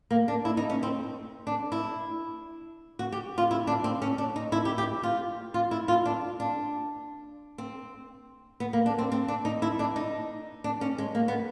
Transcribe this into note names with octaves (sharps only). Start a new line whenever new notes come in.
A#3
D4
E4
D#4
C#4
C4
D4
E4
F#4
G4
F4
E4
D4
C4
C#4
D4
D#4
E4
G4
G4
F4
F4
E4
F4
D4
D4
C4
B3
A#3
D4
C4
C4
D4
D#4
E4
D4
D#4
D4
C#4
G#3
A#3
B3